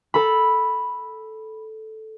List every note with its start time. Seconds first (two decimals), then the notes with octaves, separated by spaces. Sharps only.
0.14 A4 B5